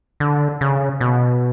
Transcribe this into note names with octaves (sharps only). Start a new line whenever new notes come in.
D3
C#3
B2